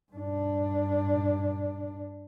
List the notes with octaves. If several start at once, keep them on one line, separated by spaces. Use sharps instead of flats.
G2 D4